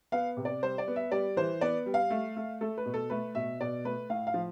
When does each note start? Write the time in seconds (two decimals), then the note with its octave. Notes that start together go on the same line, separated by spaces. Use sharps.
0.12 B3 F5
0.37 C3
0.45 D5
0.62 G3 C5
0.78 D5
0.88 B3
0.96 E5
1.11 G3 D5
1.37 E3 C5
1.61 B3 D5
1.86 G3
1.94 F5
2.11 A3
2.37 A3
2.61 A3 A4
2.78 B4
2.86 B2
2.94 A4
3.10 A3 B4
3.35 B2 E5
3.60 B2 D5
3.85 A3 B4
4.10 A2 F5
4.27 F5
4.34 F3